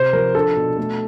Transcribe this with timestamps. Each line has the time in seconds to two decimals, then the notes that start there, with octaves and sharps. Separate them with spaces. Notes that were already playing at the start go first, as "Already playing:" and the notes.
Already playing: C3 C5
0.13 F3 A#4
0.35 D4 A4
0.56 B2
0.78 A3